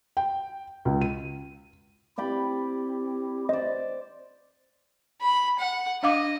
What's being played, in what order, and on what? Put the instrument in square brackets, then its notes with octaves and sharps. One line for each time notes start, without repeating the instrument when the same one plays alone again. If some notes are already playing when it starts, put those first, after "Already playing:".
[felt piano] G5
C#2
D#7
[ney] C4 [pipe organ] E4 G4 [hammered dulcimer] D5 G5 B5
[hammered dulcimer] C5 D5 [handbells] D#5
[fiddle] B5
F#5
[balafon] D4 F5 D6 [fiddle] D#5